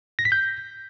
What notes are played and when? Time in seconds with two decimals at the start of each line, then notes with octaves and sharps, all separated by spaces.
0.19 A#6
0.25 B6
0.32 G6